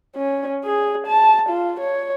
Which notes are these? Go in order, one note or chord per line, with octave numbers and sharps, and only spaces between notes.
C#4
G#4
A5
F4
C#5